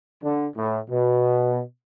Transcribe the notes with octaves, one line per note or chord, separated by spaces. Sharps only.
D3
A2
B2